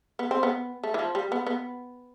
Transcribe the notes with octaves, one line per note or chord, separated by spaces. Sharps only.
B3
C4
B3
A3
E3
F3
G3
B3
B3